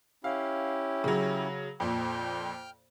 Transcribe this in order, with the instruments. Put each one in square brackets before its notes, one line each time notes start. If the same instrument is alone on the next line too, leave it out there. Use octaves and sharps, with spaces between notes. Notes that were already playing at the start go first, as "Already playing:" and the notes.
[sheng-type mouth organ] C#4 E4 G4 [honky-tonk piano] F5
[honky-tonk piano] C#3 F#3
[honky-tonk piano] F2 A#2 [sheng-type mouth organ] G5 F6 G6